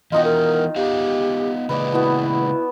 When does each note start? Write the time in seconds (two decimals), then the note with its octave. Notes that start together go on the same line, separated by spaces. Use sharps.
0.12 D#3 E3 B3 D#4 F4 F#4 D#5
0.24 A#4
0.76 B3 G4 C5 F5
1.69 C#3 G#3 A#3 B4 D5 D#5
1.93 B3 E4 F#4 A5